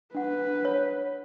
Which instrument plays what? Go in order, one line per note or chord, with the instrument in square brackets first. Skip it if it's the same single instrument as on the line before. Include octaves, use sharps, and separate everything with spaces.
[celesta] D4 F#5 [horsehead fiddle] B4
[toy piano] C#5